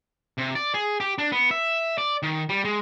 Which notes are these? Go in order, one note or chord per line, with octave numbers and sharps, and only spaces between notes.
C3
D5
G#4
G4
D4
B3
E5
D5
D#3
G3
G#3